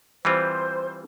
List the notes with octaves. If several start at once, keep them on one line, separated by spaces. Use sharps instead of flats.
E3 G3 C4 F4 C5